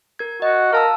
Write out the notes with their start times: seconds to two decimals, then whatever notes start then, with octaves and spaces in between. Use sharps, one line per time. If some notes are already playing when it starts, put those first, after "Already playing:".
0.19 A#4 G#6
0.42 F#4 D#5
0.73 A#4 F5 A5 E6